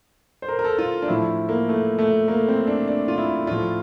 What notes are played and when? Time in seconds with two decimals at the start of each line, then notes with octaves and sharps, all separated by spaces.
0.42 C5
0.49 A#4
0.59 A#4
0.64 A4
0.79 F4
1.02 D4
1.08 A2 F3 E4
1.49 A#3
1.69 A3
1.98 A3
2.28 A#3
2.48 C4
2.67 D4
2.88 D4
3.08 F4
3.18 E4
3.47 A2 F3 F4